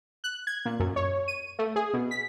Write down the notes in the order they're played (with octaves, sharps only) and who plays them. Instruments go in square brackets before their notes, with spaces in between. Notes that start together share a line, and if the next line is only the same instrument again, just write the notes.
[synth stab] F#6
G#6
A#2
F#2
C#5
D#7
A3
G#4
B2
B6